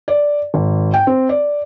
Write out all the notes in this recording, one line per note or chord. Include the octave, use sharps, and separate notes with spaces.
D5
G#1
G5
C4
D5